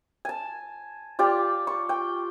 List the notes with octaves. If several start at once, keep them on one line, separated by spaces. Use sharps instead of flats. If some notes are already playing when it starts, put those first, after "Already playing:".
G#5 A5
F4 G4 D5
C#6
G5